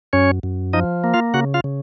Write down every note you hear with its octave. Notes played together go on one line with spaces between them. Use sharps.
F#2 C#4 C#5
F#2
F3 D#4 D#5
A#3
F4 F5
C#3 F#4 F#5
F4 F5
C#3